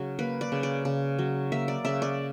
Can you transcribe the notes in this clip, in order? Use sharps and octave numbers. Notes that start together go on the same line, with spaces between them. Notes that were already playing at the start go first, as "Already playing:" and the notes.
Already playing: C#3 F#3
A#3 B4
D5
C#3
D5
C#3
F#3
A#3 E5
D5
C#3 E5
D5